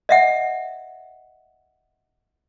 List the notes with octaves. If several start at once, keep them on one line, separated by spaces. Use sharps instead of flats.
D#5 E5 F#5